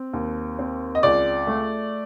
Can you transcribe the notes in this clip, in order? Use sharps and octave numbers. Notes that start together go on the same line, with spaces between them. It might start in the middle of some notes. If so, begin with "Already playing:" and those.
Already playing: C4
D#2
C4
D#5
C#2 D5
A3